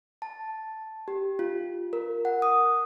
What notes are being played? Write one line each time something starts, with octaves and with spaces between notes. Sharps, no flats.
A5
G4
F4
A#4
F#5
D#6